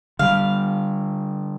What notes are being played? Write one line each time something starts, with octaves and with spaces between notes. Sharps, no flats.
D3 G3 F5